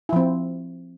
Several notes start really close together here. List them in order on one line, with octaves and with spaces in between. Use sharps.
E4 F3 C4